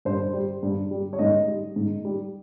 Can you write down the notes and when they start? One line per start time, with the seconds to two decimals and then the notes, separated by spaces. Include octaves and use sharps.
0.05 G2 C5
0.33 G3
0.63 G2
0.91 G3
1.13 C#5
1.19 G#2 D#5
1.48 G3
1.76 G#2
2.05 G3